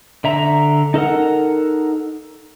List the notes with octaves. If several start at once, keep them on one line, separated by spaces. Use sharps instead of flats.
D3 E5 A#5
D#4 A4 A#4 F#5